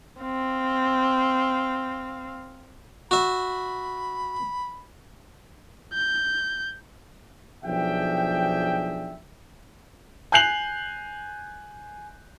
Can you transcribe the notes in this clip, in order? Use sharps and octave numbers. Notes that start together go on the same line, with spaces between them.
C4 F5
F#4 E5 B5
G6
B1 F3 D4 G#4 E5 G5
G#5 F#6 G6 C7 F7 F#7